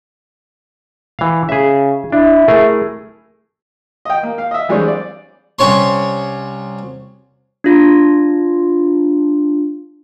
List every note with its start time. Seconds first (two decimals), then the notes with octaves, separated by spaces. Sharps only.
1.19 E3 F5
1.49 C#3 G#4 E5
2.12 D4 E4
2.48 A3 G#4 A#4
4.05 D#5 G5
4.23 A#3
4.38 F5
4.51 D#5 E5
4.69 E3 G3 G#3 C4 D4 C#5
4.88 D5
5.59 C2 C#4 C#5 C6
7.64 D4 F4